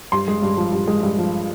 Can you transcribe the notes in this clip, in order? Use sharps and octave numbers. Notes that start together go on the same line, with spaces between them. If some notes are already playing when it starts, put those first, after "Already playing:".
G2 C6
G#3
G2
F3
G2
G#3
G2
F3